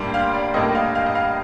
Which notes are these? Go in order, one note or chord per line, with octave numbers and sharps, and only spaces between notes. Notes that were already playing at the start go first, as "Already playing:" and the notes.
Already playing: A2 G3 A#3 D4 C6
F5
D5
A2 G3 A#3 D4 D#5
F5
F5
D#5
F5